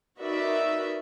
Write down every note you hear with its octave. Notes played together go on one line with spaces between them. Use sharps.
D#4 F#4 A#4 B4 D5 E5